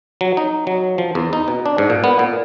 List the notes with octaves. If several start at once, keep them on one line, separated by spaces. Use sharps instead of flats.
F#3
D#4
F#3
F3
E2
D#4
B2
D4
G#2
A#2
B3
A#2